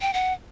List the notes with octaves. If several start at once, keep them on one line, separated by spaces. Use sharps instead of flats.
G5
F#5